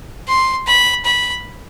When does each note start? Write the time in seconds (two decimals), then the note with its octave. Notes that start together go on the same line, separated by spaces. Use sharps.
0.28 C6
0.67 B5
1.05 B5